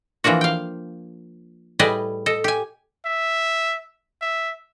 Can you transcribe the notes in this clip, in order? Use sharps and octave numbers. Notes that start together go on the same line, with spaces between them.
E3 F3 A#3 D4 F#4
F5 G5
A2 G3 G#4 B4 D5 D#5
A4 D#5
G4 G#5
E5
E5